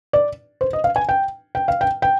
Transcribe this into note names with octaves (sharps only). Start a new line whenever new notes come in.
D5
C5
D#5
F5
G#5
G5
G5
F5
G5
G5